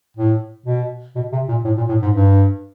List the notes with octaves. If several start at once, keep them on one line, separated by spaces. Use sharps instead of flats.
A2
B2
B2
C3
A#2
A2
A#2
A2
G#2
G2